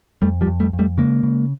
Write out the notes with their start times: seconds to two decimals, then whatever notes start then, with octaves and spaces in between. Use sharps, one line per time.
0.22 F2 G3 A3
0.41 F3 G3
0.47 F2
0.60 G3 A3
0.73 F2
0.79 G3 A3
0.98 C#3 G#3 A#3
1.23 C#3